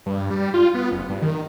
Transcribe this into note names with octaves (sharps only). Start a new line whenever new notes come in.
G2
G3
F4
B3
F#1
G2
D#3